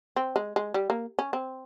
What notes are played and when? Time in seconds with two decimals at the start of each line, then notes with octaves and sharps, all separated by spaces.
0.16 C4
0.36 G#3
0.56 G#3
0.74 G3
0.90 A#3
1.19 C#4
1.33 C4